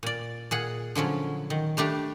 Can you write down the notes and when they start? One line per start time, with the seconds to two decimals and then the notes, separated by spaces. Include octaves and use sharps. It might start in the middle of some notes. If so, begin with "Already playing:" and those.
0.03 A#2 D5
0.51 A#2 G#4 F#5
0.95 D3 F3 F#3 C#4
1.50 D#3
1.77 G3 A3 D4 G4